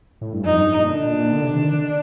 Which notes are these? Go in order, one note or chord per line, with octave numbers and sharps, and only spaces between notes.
A2
G2
F2 D#4
G2
A#2
D3 D4
A#2
A#2
D3
C3
D#3
D3